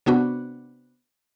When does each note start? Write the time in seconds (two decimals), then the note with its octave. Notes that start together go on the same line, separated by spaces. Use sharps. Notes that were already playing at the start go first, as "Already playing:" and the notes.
0.06 C3 B3 D4 F#4